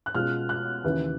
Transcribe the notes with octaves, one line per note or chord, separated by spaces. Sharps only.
F#6
B2 G#3 C#4 F4 F6
F#6
D#2 C#3 E3